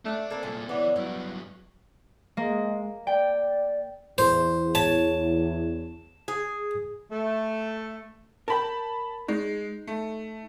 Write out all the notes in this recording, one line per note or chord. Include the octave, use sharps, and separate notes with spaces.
A3 D4
A#3 C4 A4
C2 A#2 G#5
E3 B3 D4 C#5
G2 F#3 E4
G#3 A#3
D5 G5
E2 C5
C#5 A5
G#4
A3
A#4 G5 A5 B5
G#3 D#4
A3